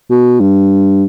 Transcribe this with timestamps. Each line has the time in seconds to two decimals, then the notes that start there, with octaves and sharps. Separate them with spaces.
0.10 B2
0.40 G2